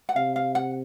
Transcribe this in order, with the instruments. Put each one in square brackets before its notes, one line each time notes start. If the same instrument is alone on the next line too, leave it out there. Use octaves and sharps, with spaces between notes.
[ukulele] F#5
[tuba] C3 [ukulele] F5
[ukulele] F5
F#5